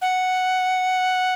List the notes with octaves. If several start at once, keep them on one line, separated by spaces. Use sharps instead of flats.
F#5